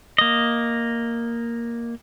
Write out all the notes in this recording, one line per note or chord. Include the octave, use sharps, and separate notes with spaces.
A#3 D#5